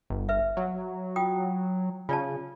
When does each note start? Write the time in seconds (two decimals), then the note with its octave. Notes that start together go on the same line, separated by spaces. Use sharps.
0.10 G1
0.29 B4 E5
0.57 F#3
1.16 F4 G5 D#6
2.09 C#3 F4 D5 A5